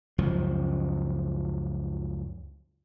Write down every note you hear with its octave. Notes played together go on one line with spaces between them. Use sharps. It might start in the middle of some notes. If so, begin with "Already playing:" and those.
C#2 F#2 F3